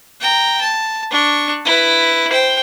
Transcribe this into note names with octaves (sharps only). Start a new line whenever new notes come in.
G5 A#5
A5
D4 C#6
E4 B4
C5 G5